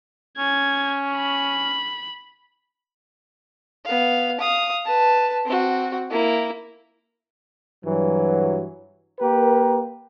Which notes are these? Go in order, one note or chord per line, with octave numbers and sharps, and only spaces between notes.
C#4 G#6
B5
B3 F5
F5 D#6
B4 A5
C4 F#4
A#3 E4
G2 E3 F#3
A#3 G4 A#4 B4